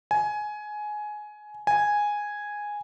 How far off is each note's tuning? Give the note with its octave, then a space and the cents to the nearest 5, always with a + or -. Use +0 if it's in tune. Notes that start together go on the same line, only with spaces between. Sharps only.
G#5 +15
G#5 -5